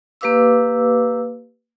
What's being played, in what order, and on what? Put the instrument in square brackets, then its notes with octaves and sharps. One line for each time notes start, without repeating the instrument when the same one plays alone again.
[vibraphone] A#3 G4 B4 F5 D6 E6